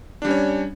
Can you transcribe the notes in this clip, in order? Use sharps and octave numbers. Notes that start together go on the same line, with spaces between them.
G3 C#4 D4 C#5